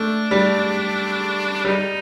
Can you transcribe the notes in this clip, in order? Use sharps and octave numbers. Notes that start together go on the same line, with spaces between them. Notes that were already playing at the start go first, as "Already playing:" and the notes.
Already playing: A3 D4
G3
G3 D#4